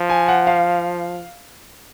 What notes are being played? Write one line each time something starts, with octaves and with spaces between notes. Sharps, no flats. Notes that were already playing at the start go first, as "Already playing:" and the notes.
Already playing: F3
G#5
F#5
F5